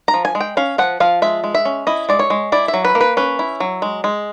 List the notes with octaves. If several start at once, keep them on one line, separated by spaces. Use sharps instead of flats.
A#5
F3
G#5
G#3
G5
C#4 F5
F3 F#5
F3 F5
G#3 E5
G#3
E5
C#4
E4 D#5
G#3 D5
C#5
G#3
E4 D5
E5
F#3
B4
A#3
B4
C#4 B4
E4
F#3
G#3
G#3